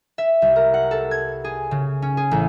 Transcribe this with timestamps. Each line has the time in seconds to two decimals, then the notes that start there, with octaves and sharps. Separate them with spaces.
0.18 E5
0.42 C2
0.56 A#4
0.74 F#5
0.91 A4
1.11 G#6
1.44 G#4
1.71 C#3
2.02 C#4
2.17 G#4
2.31 A1